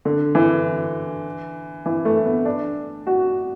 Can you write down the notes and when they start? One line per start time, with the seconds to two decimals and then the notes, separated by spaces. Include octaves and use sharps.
0.05 D3
0.35 E3
1.86 E3
2.05 A3
2.25 B3
2.45 D4
3.07 F#4